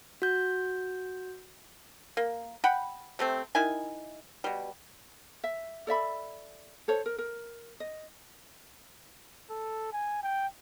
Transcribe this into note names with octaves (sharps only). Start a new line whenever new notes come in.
F#4 G6
A#3
F#5 G5 B5
C3 A3 C4
D#3 E4 G#5
B2 G3
E5
A4 D5 E5 B5
A4 C5 C#5
A#4
A#4
D#5
A4
G#5
G5